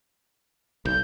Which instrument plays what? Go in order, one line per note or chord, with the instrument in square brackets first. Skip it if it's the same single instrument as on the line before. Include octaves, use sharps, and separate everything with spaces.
[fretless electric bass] B1 [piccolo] G6